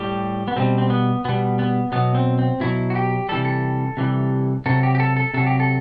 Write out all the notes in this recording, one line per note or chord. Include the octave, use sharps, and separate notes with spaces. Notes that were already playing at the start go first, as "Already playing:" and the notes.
Already playing: A2 G3 G4
B3
B2 G3 C4
C4
B3
B2 G3 B3
B3
B2 F#3 B3
C4
C4
B2 F#3 E4
F#4
G4
C3 E3 G3 A4
A4
C3 E3 G3
C3 F#3 A4
G4
G4
A4
A4
C3 F#3 A4
G4
A4